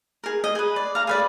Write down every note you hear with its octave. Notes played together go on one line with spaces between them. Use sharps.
G#4 A#4
D#5
G#4 B4
D5
F5 A#5
G#4 B4 D5